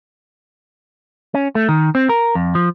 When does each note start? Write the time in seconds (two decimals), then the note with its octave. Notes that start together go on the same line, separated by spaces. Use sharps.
1.34 C#4
1.55 A3
1.69 D#3
1.95 C4
2.09 A#4
2.35 F2
2.55 F3